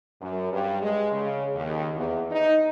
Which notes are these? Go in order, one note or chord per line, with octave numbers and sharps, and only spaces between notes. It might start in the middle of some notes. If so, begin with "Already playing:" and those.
F#2
G2
G#3
C#3
D#2
E2
D#4